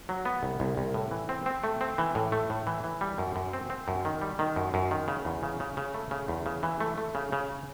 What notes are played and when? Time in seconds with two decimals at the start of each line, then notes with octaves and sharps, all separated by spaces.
0.09 F#3
0.25 B3
0.43 C2
0.60 C2
0.77 C2
0.94 A2
1.11 E3
1.29 C4
1.46 C4
1.64 A3
1.81 C4
1.98 E3
2.15 A2
2.32 A3
2.50 A2
2.67 E3
2.84 E3
3.01 G3
3.18 F#2
3.36 F#2
3.53 C4
3.70 C4
3.88 F#2
4.05 D#3
4.22 G3
4.39 D#3
4.56 F#2
4.74 F#2
4.91 D#3
5.08 C#3
5.25 E2
5.43 C#3
5.60 C#3
5.77 C#3
5.94 A3
6.11 C#3
6.28 E2
6.46 C#3
6.63 E3
6.80 A3
6.98 A3
7.15 C#3
7.32 C#3